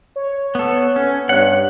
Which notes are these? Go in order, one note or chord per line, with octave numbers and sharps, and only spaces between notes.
C#5
B3 A4
B3 C#4
G2 C#5 F#5 F#6 C#7